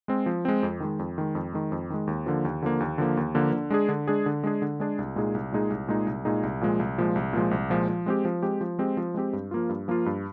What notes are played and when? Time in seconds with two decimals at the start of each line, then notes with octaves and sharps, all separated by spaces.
0.08 G#3 C4
0.26 F3
0.45 G#3 C4
0.63 F2
0.80 D#3 G#3
0.99 F2
1.18 D#3 G#3
1.35 F2
1.53 D#3 G#3
1.72 F2
1.90 D#3 G#3
2.07 D#2
2.26 D3 F3 A#3
2.45 D#2
2.62 D3 F3 A#3
2.80 D#2
2.98 D3 F3 A#3
3.17 D#2
3.35 D3 F3 A#3
3.53 D3
3.70 G#3 D4 G#4
3.89 D3
4.08 G#3 D4 G#4
4.26 D3
4.44 G#3 D4 G#4
4.62 D3
4.80 G#3 D4 G#4
4.98 C2
5.16 A#2 G#3 D#4 G#4
5.35 C2
5.52 A#2 G#3 D#4 G#4
5.70 C2
5.88 A#2 G#3 D#4 G#4
6.06 C2
6.25 A#2 G#3 D#4 G#4
6.43 C2
6.61 A#2 F3 G#3
6.79 C2
6.98 A#2 F3 G#3
7.16 C2
7.33 A#2 F3 G#3
7.51 C2
7.70 A#2 F3 G#3
7.89 F3
8.06 G#3 C4 G4
8.25 F3
8.43 G#3 C4 G4
8.61 F3
8.79 G#3 C4 G4
8.97 F3
9.14 G#3 C4 G4
9.33 G2
9.51 F3 A#3 F4
9.69 G2
9.88 F3 A#3 F4
10.06 G2